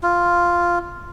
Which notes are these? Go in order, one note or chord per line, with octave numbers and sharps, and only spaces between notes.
F4